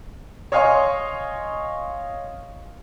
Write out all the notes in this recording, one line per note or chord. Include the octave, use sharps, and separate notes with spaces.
C#5 D#5 F5 G#5 C6 C#6